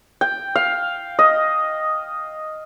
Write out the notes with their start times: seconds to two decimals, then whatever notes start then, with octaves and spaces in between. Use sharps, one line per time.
0.21 G5
0.55 F5
1.19 D#5